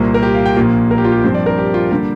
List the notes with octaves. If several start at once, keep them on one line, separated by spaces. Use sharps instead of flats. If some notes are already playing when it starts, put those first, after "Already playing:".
Already playing: C2 A#2 A#3 C5
A#4
G4
F5
G5
A#1 A#2 A#3 F4
A#4
G4
F4
G4
G2 F3 C4 C5
D5
A#4
G4
F4
D3 G3 A#3 G4